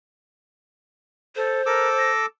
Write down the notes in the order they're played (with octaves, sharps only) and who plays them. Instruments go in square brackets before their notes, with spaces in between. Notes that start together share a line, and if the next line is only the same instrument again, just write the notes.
[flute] A4 [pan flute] C5
[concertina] A4 D6 E6 [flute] A#4
[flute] A#6